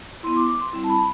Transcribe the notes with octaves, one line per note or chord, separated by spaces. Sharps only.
B3 E4 C6
D6
D6
C6
G3 C4 E4
A5
B5